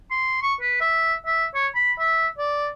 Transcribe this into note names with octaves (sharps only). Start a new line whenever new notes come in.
C6
C#6
B4
E5
E5
C#5
B5
E5
D5